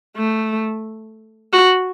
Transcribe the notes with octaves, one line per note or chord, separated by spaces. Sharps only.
A3
F#4